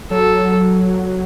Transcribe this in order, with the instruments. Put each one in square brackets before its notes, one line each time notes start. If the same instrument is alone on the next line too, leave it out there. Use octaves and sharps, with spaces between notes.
[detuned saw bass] F#3 [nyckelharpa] A4